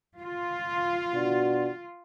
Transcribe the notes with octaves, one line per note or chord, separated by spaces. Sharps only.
F4
B2 D4 F#4